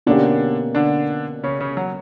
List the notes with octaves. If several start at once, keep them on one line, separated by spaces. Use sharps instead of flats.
B2 D3 A#3 C#4 D4 G4
D3 D4
C#3 C#4
C#3 C#4
F#3